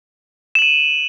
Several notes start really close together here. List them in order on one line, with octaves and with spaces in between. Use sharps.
E7 F#7 D#7